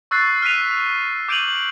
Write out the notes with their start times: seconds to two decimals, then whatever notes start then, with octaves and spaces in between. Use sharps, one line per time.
0.11 C#6 E6 F#6 A6 C7
0.42 F6 F#6 B6 D#7 F7
1.28 D6 G6 D7 D#7 F7 F#7